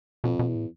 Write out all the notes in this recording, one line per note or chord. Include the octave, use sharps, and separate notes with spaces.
F2 B2
B2
E2
A2